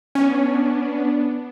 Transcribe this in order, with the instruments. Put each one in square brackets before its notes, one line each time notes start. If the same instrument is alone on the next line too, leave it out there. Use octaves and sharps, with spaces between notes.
[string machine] B3 D4 [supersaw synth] C#4